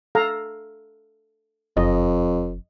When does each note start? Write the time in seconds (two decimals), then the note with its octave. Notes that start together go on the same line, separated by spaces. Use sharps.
0.15 A4 F5 A#5
1.77 F#1 F2 D#5